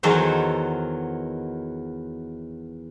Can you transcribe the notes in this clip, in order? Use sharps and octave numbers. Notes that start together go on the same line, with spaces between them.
E2 D#3 F#3 A4 C5